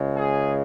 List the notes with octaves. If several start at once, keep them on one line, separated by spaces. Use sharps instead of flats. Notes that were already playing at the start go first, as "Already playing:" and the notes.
Already playing: C#2 C#3 G#3
G#4